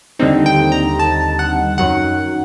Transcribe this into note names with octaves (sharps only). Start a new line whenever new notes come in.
D#2 D3 G3 C4 D#4
G5
A#5
A5
F#5
F#2 D#3 F#3 F#5